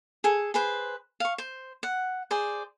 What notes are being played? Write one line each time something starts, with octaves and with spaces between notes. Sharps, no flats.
G#4 A4
G#4 B4 C5
F5 C#6
C5
F#5
G#4 C5 D5